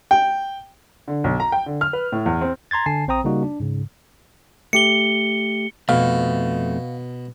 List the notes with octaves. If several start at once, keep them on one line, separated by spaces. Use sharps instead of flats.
G5
D3
B1
A#5
G5
D3
F6
B4
A2
E2
C4
A#5 C6 G#6 A6
D3 G#5 A5 C7
A#1 C4 C5 G5 A#5 D#6
C#3 G3 A#3 D#4 F#4
D4
G#2 C#3
A3 G4 C#7 G7
F2 B2 A3 F5